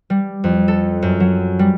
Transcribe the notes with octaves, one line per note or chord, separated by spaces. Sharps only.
G3
F2
A4
F#2
F#3
G3